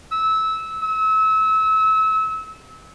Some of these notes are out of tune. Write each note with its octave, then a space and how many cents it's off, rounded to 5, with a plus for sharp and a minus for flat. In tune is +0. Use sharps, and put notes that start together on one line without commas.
E6 -20
E6 -30